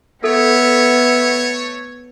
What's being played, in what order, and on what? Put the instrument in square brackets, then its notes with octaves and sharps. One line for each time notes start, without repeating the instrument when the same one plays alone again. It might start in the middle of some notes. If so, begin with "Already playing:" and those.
[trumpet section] A3 C#5 [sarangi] B3 [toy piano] A4 [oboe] E5